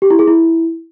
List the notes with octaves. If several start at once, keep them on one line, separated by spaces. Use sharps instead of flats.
G4
E4
G#4
E4